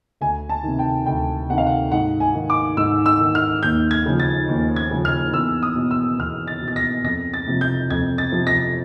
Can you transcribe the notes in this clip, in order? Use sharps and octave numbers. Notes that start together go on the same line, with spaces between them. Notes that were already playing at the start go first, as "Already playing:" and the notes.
D2 G#5
A5
C3 D#3
G5
D2 G5
C3 D#3 F#5
F5
F#5
G#2 F#5
G#5
D#3
D6
G#2 E6
E6
D#3
F6
D#2 G6
G#6
C#3 F3
A6
D#2
G#6
C#3 F3
F6
E2 E6
D#6
B2
E6
E2 F6
A6
B2
A6
A#6
F2 A#6
A6
C3 F3
G6
F2 G#6
A6
C3 F3
A#6